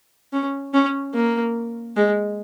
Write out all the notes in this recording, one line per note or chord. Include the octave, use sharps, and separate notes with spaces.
C#4
C#4
A#3
G#3